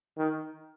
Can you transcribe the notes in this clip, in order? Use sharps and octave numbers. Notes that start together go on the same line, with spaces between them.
D#3